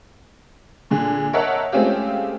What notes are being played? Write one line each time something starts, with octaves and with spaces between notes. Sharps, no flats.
A#2 D3 G#4
A#4 C#5 D#5 E5 F#5 A5
G#3 A3 C4 C#4 F4 G4